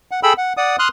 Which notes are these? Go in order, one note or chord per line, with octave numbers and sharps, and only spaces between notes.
F#5
G#4 A4 G5 B5 E6
F#5
D5 F#5 D#6
C6 D#6 F6 F#6